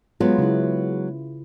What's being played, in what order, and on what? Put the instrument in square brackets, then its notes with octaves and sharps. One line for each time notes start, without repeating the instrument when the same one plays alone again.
[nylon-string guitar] F#3 G#3 B3 [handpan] F4 B4
[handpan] C#3 E4